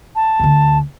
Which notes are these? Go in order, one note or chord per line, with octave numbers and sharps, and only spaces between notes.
A5
D2 D3